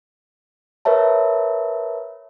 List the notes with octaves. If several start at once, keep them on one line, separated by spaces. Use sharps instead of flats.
A#4 B4 C#5 E5 A5